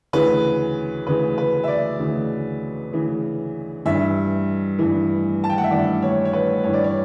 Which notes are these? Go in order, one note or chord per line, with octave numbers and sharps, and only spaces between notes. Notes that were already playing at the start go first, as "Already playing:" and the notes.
D2 C#3 E3 B4
D2 C#3 E3 B4
B4
E5
D5
D2 C#3 E3
D2 C#3 E3
G2 E3 E5
G2 E3
A5
G5
F#5
E5
G2 E3 D5
C#5
C#5
B4
G2 E3 C#5
D5
C#5